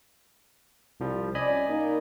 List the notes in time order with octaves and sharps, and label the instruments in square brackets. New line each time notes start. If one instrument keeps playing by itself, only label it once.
[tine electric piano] C2 F3 G3
[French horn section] C#4 D5 [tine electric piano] D#5 G#5 B5
[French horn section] A#3 D#4